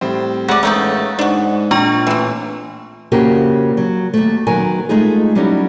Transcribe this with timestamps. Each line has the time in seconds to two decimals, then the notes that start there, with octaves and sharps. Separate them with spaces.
0.01 A2 G3 C4
0.48 D2 G#3 G#4 D5 F#5
0.63 A1 A3 A#3 D#4 F#5 A#5 C#6
1.19 G#2 D4 F#4
1.71 A#2 D4 F4 A#5 C#6
2.07 A1 E3 C4
3.12 F2 C#3 A#3 F#4 G4 A#4
3.77 F#3
4.13 D#2 A3
4.47 E2 D#3 F#3 A#4 G#5
4.89 G#3 A3 D#4 F4 G#4
5.35 F#3 G3 C#4 D#4 E4 G4